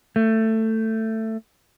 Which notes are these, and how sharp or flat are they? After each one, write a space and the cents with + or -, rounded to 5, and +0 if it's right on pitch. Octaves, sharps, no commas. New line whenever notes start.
A3 +15